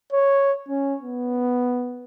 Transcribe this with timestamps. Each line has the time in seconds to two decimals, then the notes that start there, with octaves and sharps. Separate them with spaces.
0.13 C#5
0.69 C#4
1.02 B3